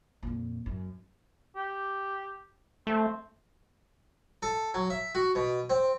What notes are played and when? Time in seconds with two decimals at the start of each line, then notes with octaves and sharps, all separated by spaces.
0.23 F2 A#2
0.66 F#2
1.56 G4
2.87 A3 C4
4.42 A4
4.74 F#3
4.90 E5
5.15 F#4
5.35 B2
5.70 C4